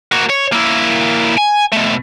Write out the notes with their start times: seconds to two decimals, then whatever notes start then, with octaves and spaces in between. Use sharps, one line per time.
0.12 A#3 F#4
0.29 C#5
0.52 A#3 E4
1.37 G#5
1.72 B2 A3